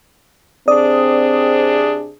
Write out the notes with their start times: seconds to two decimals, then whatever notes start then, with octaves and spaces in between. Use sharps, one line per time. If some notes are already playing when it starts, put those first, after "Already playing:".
0.68 C3 C4 D4 G#4 D5 D#6